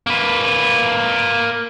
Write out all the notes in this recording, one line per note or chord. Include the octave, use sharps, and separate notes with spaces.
A#3 B4